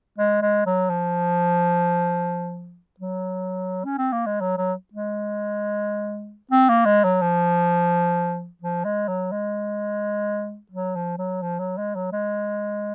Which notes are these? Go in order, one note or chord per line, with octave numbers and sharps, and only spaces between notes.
G#3
G#3
F#3
F3
F#3
C#4
C4
A#3
G#3
F#3
F#3
G#3
C4
A#3
G#3
F#3
F3
F3
G#3
F#3
G#3
F#3
F3
F#3
F3
F#3
G#3
F#3
G#3